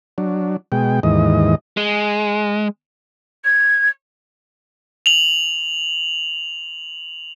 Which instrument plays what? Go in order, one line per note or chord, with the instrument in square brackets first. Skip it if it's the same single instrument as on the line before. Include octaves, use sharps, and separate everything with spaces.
[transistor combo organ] F#3 D4
B2 G#3 G5
D#2 G#2 E3 D#5
[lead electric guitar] G#3
[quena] G#6
[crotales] F7 F#7